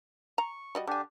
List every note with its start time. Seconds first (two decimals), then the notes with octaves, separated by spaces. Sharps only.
0.38 A#5 C#6
0.75 G3 F#4 D#5
0.87 D3 D4 G4 G#5